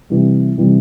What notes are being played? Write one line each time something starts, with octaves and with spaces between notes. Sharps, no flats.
C3 E3 G3
C3 E3 G3